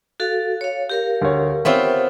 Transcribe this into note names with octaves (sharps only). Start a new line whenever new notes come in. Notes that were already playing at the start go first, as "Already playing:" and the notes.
F#4 A4 F5
C#5 F5
G4 A#4 F5
D2 C#5
B3 C4 F4 C#5 E5